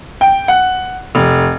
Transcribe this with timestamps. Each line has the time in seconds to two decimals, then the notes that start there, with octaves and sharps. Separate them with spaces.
0.21 G5
0.48 F#5
1.15 F1